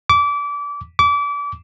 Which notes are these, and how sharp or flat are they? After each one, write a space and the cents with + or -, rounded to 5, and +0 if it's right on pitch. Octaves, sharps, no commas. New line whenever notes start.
D6 -25
D6 -30